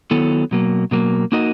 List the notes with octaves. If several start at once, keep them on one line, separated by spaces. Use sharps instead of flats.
D#3 F#3 B3 E4 A4
B2 F#3 A#3
B2 F#3 A#3
A#3 D#4 F#4 A#4 D#5